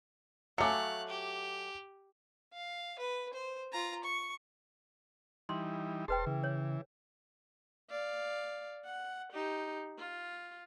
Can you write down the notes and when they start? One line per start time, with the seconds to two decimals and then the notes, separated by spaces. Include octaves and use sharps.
0.58 F#3 A3 F5 G#5 D6 F#6 C#7
1.08 G4
2.53 F5
2.98 B4
3.33 C5
3.72 F4 A#5
4.04 C#6
5.49 E3 G3 D#4 C6
6.08 E1 G#4 B4 C5 G5 A5 C6
6.26 C#3 E3
6.44 C#5
7.90 D5 F5
8.85 F#5
9.33 D#4 G4
9.99 F4